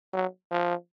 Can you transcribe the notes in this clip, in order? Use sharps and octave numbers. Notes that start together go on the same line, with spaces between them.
F#3
F3